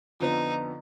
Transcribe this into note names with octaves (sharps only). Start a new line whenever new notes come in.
F2 D3 F3 B3 D#4